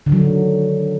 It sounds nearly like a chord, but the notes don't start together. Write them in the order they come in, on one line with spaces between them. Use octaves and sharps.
D3 D#3 F#3